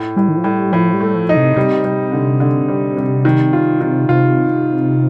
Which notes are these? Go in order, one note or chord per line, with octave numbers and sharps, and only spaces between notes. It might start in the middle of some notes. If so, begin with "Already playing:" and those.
Already playing: A2
A2 G3
D#3
F3
A2 G3
A2 F3
G3
A3
F3
D#4
C3
C3 G3
G3
D3
D3
G3
G3
D#3
F4
D#3
C3 F4